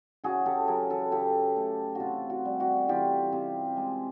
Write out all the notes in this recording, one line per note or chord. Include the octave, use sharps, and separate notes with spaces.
C#3 F#4 G#4
G4 A4
F#3 G#4 A#4
A4 B4
C#3 G4 A4
A3
C3 F4 F#4
F#4
G3
F#4
E3 F4 G4
C3
G#3